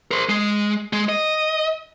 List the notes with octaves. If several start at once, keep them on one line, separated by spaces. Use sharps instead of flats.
A#4 C5
G#3
G#3
D#5